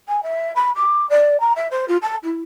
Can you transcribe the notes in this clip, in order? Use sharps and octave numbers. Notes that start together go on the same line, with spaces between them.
G#5
E5
B5
D6
D5
A#5
E5
C5
F4
A5
E4